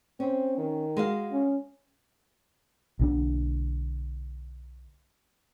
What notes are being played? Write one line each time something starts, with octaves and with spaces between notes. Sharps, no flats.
C4 C#4
D#3
G#3 F#4 F5
C#4
B1 D3 D4